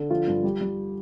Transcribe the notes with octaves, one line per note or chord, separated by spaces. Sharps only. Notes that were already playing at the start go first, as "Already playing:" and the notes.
Already playing: D3
F3 F4
G2
G3 G4
G3